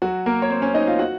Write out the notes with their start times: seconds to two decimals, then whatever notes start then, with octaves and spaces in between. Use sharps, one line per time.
0.02 F#3 F#4
0.26 A#3 A#4
0.42 C#5
0.50 C4 C5
0.62 C#4 C#5
0.74 D#4 D#5
0.87 F4 F5
0.99 F#4 F#5